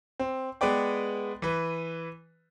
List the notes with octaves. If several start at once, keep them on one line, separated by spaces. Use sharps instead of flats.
C4
G#3 B3 B4 D5 G5
E3 B4